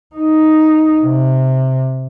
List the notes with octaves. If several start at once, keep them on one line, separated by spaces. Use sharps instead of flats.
D#4
C3